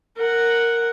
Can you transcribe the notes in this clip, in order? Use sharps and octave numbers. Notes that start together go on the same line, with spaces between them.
A#4 F#5